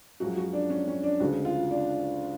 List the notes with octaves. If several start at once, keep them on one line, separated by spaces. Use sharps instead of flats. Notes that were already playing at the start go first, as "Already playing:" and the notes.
F#2 F3 G#3 F#4
F#4
D4
C#4
C#4
D4
D2 C#3 G#3 F#4
F4
D4